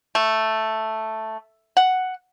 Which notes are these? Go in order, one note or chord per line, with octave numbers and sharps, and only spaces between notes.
A3
F#5